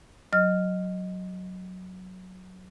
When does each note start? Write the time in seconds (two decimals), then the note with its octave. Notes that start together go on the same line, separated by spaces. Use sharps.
0.33 F#3 D#5 F6